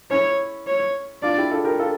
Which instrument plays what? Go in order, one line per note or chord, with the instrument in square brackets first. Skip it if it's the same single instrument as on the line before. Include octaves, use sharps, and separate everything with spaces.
[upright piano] C#4 E4 [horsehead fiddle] C#5
[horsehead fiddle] C#5
[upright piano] D4 F4 [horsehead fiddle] D5
[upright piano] E4 G4
F4 A4
G4 A#4
F4 A4